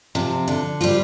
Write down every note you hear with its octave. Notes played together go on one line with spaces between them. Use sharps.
C3 F3
D3
G3 C4 F4